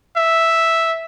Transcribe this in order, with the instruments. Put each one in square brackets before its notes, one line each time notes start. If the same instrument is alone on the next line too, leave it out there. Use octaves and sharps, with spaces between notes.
[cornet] E5